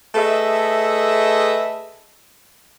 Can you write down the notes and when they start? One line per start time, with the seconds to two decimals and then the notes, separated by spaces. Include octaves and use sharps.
0.15 A3 G#4 A4 B4 D#5 E5